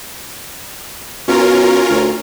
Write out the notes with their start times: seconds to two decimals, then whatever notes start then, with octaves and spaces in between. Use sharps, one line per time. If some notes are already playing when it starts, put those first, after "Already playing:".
1.28 B2 C#4 F4 A#4
1.90 D2